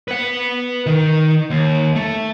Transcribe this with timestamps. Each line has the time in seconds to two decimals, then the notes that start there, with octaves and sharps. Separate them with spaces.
0.08 B4 F#5
0.87 D#3
1.50 D#2
1.96 A3